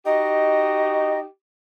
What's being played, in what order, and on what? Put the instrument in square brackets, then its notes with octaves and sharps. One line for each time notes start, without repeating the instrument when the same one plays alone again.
[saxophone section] D#4 F#4 G4 [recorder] D#5